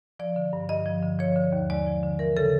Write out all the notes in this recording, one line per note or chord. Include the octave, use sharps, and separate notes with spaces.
F3 D5
D3
G2
G2 D#5
F3
D3
F3 C#5
D3
D#2
G#3 D5
F3
D3
E3 A#4
C#3 A4